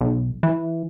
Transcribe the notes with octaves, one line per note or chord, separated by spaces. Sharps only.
B1
E3